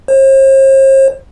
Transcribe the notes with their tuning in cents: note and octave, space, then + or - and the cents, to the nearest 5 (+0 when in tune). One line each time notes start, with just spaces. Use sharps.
C5 +45